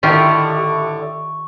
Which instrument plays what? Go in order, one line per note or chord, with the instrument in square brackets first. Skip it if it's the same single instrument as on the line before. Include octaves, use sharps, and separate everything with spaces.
[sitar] A2 D3 [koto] D#3 F4 G4 [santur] C#6